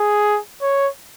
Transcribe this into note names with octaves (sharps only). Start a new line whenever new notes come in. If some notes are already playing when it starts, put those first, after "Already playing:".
Already playing: G#4
C#5